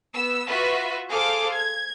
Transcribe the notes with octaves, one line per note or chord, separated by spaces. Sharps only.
B3 E6
F4 F#4 B4 E5
G#4 A4 C5 F5 D6
G#6